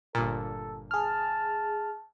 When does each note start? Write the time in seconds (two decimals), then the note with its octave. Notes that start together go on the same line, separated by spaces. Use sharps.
0.15 G1 A#2 A4
0.91 G#4 A5 F6